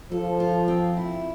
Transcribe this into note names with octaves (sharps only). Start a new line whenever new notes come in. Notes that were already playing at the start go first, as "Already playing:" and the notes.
F3 A4
F4
C4
E4